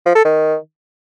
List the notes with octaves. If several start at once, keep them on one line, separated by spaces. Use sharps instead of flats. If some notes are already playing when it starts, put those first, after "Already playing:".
F3
A4
D#3